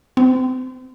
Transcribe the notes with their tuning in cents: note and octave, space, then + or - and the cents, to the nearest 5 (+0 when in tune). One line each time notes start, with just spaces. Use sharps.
C4 -35